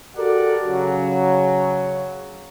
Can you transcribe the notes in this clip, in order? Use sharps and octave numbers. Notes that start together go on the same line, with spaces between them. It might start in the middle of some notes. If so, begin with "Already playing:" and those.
F#4 G4 A4 A#4 D5 F#5
C#3 F#3